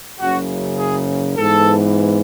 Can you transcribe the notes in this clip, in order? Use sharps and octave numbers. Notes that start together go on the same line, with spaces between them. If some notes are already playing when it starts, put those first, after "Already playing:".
F#1 F#2 C#3 F#4
G#4
G#2 E3 B3 A4